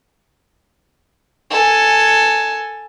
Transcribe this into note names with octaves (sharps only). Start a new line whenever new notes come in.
A4 G#5